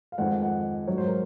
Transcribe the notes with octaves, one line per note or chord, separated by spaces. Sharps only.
F5
F2 D#3 G#3 F#5
F#5
G#2 F#3 C#5
C5
A#4